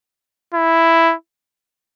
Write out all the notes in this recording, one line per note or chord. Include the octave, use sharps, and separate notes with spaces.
E4